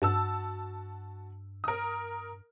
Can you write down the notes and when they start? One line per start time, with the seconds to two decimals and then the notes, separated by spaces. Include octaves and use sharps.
0.02 G2 F#4 A5 E6
1.64 A#4 D#6